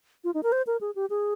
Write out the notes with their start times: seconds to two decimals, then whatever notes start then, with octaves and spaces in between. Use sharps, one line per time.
0.24 F4
0.34 D#4
0.43 A#4
0.52 C5
0.67 A#4
0.81 G#4
0.96 G4
1.10 G#4